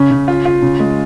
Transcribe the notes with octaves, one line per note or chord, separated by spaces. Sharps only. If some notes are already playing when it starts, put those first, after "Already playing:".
Already playing: C#3 C#4
C#3
F4
F4
C#3
G#3